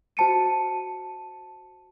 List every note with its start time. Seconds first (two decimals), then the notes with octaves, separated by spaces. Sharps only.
0.17 F#4 C5 A5 C#7 D#7